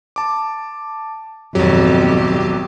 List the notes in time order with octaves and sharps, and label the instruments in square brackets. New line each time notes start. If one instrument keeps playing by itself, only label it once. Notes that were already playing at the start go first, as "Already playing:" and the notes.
[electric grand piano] A5 D6
[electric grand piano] G#1 F#3 [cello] F2 B2 [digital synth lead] G4